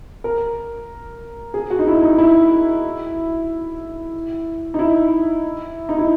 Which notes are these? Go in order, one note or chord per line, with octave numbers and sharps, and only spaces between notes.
A#4
G#4
F#4
D#4
E4
D#4
E4
D#4
E4
D#4
E4